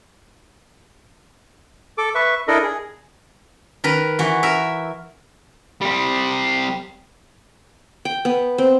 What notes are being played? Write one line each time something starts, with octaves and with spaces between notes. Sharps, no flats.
A4 D6
B4 E5 C#6
D4 E4 A4 A#4 D#5
G#4
D#3 A#4 B4
E3 F#4
A#4 E5
G3 C4
G5
B3
C4